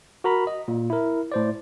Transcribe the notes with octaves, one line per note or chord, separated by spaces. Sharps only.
F#4 A#4 A#5 B5
D#5
A#2
E4 A#4
A2 C5 D5